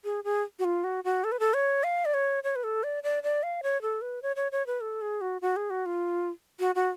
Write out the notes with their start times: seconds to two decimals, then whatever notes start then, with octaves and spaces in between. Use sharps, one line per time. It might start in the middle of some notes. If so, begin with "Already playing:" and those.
0.04 G#4
0.24 G#4
0.59 F#4
0.65 F4
0.84 F#4
1.04 F#4
1.24 A4
1.32 B4
1.40 A4
1.54 C#5
1.84 F5
2.05 D5
2.14 C#5
2.44 C#5
2.56 B4
2.64 A4
2.83 D5
3.03 D5
3.23 D5
3.43 F5
3.63 C#5
3.82 A4
4.02 B4
4.22 C#5
4.36 C#5
4.52 C#5
4.67 B4
4.81 A4
5.02 G#4
5.21 F#4
5.42 F#4
5.56 G#4
5.70 F#4
5.86 F4
6.59 F#4
6.75 F#4